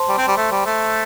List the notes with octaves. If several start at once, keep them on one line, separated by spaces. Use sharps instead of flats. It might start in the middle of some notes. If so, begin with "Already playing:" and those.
Already playing: C5 A5 C6
G3
C4
G3
A3
G3
A3